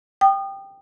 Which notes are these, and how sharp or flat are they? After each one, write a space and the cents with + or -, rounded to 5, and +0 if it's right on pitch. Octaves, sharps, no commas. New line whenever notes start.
G5 +0 D#6 -30